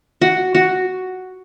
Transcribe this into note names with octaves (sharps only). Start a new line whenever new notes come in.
F#4
F#4